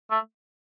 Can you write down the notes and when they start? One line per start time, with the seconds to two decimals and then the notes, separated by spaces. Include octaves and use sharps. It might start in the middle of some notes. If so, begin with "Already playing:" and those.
0.11 A3